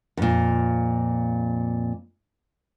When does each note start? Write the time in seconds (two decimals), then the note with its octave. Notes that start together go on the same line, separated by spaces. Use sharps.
0.17 F2 A#2